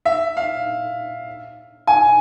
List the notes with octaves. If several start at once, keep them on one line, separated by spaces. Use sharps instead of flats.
E5
F5
G#5